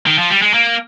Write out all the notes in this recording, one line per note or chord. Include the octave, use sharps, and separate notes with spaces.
D#3
F3
G3
G#3
A#3